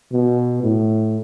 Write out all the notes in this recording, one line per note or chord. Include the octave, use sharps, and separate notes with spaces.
B2
A2